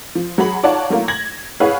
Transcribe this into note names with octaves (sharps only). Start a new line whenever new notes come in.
F3
F#3 F#4 G#4 B5 F#7
D#4 F4 C#5 D5 F#5 A5
F#3 A3 A#3 E4 F4
G#6 A#6 F#7
E4 G#4 B4 C#5 F5 F#5